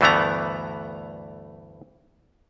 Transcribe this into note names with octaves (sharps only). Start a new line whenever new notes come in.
D2 G2 E3 A3 B3 A#5